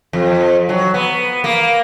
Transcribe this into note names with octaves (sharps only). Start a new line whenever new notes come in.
F2
F#3
B3
A#3